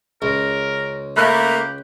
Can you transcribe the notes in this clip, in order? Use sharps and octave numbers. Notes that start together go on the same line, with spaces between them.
C#2 A#4
A3 A#3 G4 B5 F#6